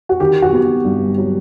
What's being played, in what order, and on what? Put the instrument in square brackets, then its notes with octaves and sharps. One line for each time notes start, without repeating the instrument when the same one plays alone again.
[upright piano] F#4
D#3 G4
F#4
B3
G2
F#3